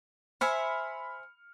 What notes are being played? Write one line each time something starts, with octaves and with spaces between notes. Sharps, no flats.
C5 E5 G#5 B5 F6 C#7